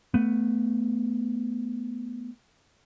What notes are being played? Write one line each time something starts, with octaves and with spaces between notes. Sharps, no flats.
A3 B3